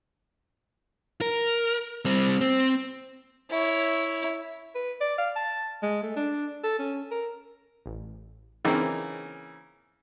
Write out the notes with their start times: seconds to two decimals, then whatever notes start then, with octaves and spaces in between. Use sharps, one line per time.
1.21 A#4
2.05 G3 C4
2.41 C4
3.50 E4 C#5
4.75 B4
5.01 D5
5.18 F5
5.36 A5
5.83 G#3
6.03 A3
6.16 D4
6.64 A4
6.79 C#4
7.11 A#4
7.86 A1
8.65 C#3 E3 A#3 C4 D#4